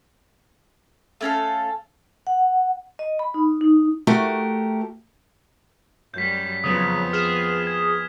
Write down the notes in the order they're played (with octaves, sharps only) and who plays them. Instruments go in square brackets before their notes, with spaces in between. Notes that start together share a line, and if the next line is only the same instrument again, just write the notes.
[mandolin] A3 C#4 A4 F5
[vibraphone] F#5
D#5
B5
D#4
D#4
[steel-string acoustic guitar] A3 F#4 G4 A#4
[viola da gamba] F#2 G3 [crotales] G6 B6
[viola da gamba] F2 B3 [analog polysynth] C#3 F#3 [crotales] D#6
[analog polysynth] G#4 [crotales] F6 E7
[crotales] G#6